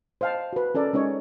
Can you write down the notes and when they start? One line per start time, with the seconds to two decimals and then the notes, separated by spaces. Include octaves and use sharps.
0.21 C5 D#5 F5 G5 A5
0.53 F#4 B4
0.75 C#4 A4 A#4 D5
0.93 G#3 C#4 D#4 C#5 D#5